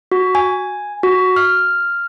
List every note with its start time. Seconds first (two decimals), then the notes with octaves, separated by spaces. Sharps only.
0.12 F#4
0.35 G#5
1.03 F#4
1.36 F6